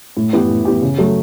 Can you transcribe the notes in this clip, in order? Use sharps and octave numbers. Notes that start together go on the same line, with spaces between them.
A2
E3 B3 E4 G4
A2
E3 B3 E4 G4
C#3
F#3 A3